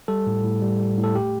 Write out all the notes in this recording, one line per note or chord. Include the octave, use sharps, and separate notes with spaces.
G3 A4
A2
A2
G3
G3
A2
A4
A3 G4